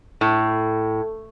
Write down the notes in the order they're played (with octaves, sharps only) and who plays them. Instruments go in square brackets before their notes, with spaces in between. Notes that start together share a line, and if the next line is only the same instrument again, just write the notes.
[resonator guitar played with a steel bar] A2